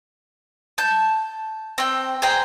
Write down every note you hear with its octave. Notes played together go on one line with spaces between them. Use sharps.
A5 G6
C4 G5
G#4 C5 G5 A#5